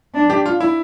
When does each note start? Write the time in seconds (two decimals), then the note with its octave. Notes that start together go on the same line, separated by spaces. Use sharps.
0.15 D4
0.30 G4
0.46 F4
0.60 E4